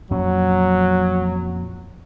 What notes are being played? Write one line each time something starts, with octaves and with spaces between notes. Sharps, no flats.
F2 A#2 F#3 C#4